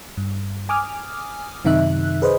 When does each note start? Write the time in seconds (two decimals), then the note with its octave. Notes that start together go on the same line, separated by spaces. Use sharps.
0.17 G2
0.69 G#5 D6 D#6 F6
1.65 F#2 C3 D#3 D#4 E5 F#6
2.22 G#4 B4 C5 D#5